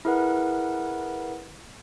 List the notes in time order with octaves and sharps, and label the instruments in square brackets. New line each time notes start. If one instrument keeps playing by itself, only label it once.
[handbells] E4 G#4 A#4 B4 F#5